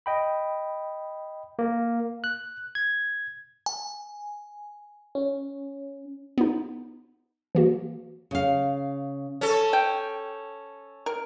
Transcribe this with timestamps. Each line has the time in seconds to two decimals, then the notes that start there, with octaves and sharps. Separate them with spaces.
0.06 D#5 G5 B5
1.59 A#3
2.24 F#6
2.75 G#6
3.66 G#5
5.15 C#4
6.38 B3 D#4
7.55 E3 A#3 F#4
8.31 C#3 F5
9.41 C#4 A4
9.73 G5
11.06 A#4